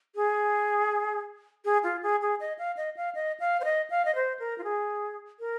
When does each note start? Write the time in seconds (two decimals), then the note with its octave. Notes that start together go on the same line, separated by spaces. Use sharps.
0.16 G#4
1.65 G#4
1.83 F4
2.03 G#4
2.22 G#4
2.40 D#5
2.59 F5
2.77 D#5
2.97 F5
3.15 D#5
3.40 F5
3.60 C5
3.64 D#5
3.90 F5
4.05 D#5
4.15 C5
4.40 A#4
4.58 F4
4.64 G#4
5.40 A#4